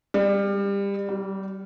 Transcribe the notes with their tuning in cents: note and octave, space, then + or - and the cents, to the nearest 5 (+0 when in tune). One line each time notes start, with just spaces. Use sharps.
G3 +25
G3 -25